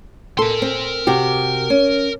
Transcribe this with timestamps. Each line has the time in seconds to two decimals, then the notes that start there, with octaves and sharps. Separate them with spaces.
0.39 A4 A#4 C6
0.62 C4
1.07 C3 F#4 G4
1.70 C#4